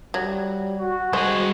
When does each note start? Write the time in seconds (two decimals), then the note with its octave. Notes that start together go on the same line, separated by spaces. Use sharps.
0.14 F#3 G3
0.77 F#4
1.13 G3 G#3 C5 G#5